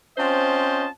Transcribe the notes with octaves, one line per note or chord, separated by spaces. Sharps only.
C4 C#4 F4 C5 D#5 A5